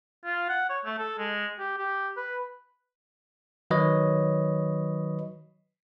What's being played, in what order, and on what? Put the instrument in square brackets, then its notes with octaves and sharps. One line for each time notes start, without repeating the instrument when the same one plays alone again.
[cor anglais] F4
F#5
C#5
A3
A4
G#3
G4
G4
B4
[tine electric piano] D#3 F#3 B4 C#5 D#5